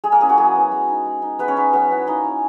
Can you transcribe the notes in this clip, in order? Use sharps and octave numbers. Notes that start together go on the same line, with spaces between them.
G#3 G#4
A#3 A#4
C#4 E4 G#4
F#4
F#3 G#4
B3 E4
G#3
D#4
G#3
D#4
G#3 B3 B4
C#4 C#5
B3 D#4 B4
F#3 B3 B4
B3 E4
A#3 D#4 D#5
C#4 E4